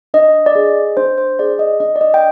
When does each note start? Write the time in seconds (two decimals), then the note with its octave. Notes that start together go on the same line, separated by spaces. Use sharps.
0.14 D4 D#5
0.46 D5
0.55 G#4 D#5
0.97 D4 C5
1.18 C5
1.39 G#4 D5
1.59 D#5
1.80 D4 D#5
1.96 D5
2.01 D#5
2.14 G5